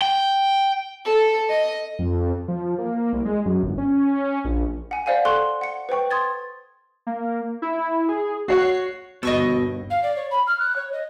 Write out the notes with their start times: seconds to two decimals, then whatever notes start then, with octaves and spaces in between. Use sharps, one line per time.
0.02 G5
1.05 A4
1.50 D#5
1.99 F2
2.48 F3
2.78 A#3
3.13 C2
3.25 G#3
3.45 F#2
3.63 G1
3.78 C#4
4.45 A#1
4.91 F#5 G#5
5.06 C5 D5 F5 F#5 G#5
5.25 A4 C6 C#6 F#6 G7
5.61 F#5 C#7
5.89 B4 C5 G5 C#6
6.11 C6 D#6 G#6 A6
7.07 A#3
7.62 E4
8.09 G#4
8.48 F#4 C#5 F#5 C7
9.23 G1 D#2 B2 D#5 C#6 E6
9.90 F5
10.03 D5
10.16 C#5
10.31 B5
10.47 F6
10.60 F#6
10.76 C#5
10.92 D#5